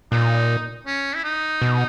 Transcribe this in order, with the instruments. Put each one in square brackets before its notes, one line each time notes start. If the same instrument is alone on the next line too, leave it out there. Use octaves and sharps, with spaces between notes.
[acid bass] A#2 [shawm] D#4
[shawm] C#4
E4
D#4
[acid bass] B2